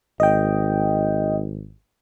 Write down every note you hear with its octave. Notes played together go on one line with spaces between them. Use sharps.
G#1 D#5 G5